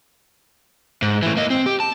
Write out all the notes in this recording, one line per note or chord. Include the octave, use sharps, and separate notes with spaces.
G#2
A2 E3
A#3 D#5
C4
G4
A5